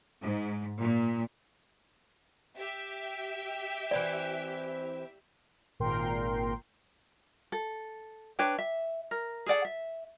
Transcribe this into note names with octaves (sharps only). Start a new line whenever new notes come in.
G#2
A#2
G4 E5
E3 C4 C5 D5
G#1 A#2 A#4 G5 C6
A4
D4 B4 C#5 G5
E5
A#4
G#4 A4 D5 F#5
E5